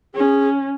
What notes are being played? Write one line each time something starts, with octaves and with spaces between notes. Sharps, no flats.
C#4 G#4